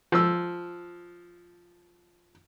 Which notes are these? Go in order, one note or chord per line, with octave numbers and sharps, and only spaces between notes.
F3 E6